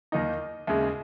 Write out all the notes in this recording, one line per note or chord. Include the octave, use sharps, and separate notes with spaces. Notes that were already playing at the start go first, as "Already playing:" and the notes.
D#2 D#3 A#3 D#4 D#5
D#2 C#3 G#3 E5